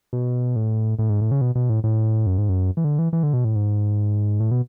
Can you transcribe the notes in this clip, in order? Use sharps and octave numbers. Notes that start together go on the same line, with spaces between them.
B2
A2
A2
G#2
A2
C#3
B2
B2
A2
A2
F#2
G#2
F#2
E3
D3
E3
E3
D3
B2
A2
G#2
A2
B2